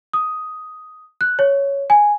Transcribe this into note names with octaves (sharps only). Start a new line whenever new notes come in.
D#6
F#6
C#5
G#5